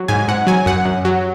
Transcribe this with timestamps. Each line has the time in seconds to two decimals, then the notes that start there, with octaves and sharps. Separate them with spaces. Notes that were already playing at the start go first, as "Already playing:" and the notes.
Already playing: F#3
0.08 G#2 G#5
0.28 G#2 F#5
0.47 F#3 G#5
0.66 F#2 F#5
0.85 F#2
1.05 F#3